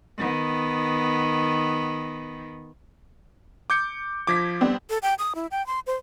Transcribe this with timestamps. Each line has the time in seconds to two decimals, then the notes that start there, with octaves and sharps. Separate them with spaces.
0.18 D#3 B3
3.70 D6 G6 C#7
4.27 F3 D6 G#6 A#6 B6
4.61 G3 B3 C4
4.90 A4
5.02 G5
5.18 D#6
5.35 E4
5.51 G5
5.66 C6
5.86 C5